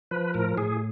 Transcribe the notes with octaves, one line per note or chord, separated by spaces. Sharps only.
F3 B4
A2 A#4
A2 G#4